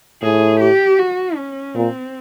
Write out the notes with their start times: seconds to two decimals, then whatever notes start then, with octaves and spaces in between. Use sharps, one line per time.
0.23 A2 G#4
0.60 G4
0.99 F#4
1.36 C#4
1.75 A#2 C4